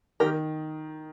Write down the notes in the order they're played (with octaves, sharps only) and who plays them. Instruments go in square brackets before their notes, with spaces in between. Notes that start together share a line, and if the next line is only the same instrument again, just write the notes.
[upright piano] D#3 [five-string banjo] G4 A#4